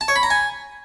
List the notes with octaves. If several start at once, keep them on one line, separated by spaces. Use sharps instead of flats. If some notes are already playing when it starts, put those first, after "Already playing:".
A5
C#5
B5
A#5
G#5